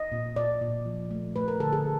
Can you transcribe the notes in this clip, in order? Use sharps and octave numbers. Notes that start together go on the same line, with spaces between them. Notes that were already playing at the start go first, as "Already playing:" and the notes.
Already playing: D#5
A#2
A#2 D5
A#2
F3
A3
A3 B4
A#4
D3 A4
G#4